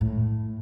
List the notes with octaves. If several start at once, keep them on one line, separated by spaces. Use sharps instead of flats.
A2